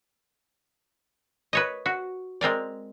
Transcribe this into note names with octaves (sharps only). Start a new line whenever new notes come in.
B4 C#5 D#5
F#4
G#3 C4 A#4 D5